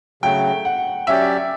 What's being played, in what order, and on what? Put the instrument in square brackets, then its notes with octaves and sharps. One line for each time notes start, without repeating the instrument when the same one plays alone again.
[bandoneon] C#3 F#3 A3 [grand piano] G5
[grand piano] F#5
[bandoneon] F#3 C#4 G4 D5 [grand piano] E5